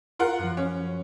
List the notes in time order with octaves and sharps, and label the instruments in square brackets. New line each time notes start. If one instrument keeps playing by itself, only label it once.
[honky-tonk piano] F4 A#4 F#5
[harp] F#2 F3
[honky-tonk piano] C#4